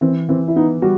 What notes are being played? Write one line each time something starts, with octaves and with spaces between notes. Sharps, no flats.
E3 C4
E3 C4
E4
B3 D#4
G3 F#4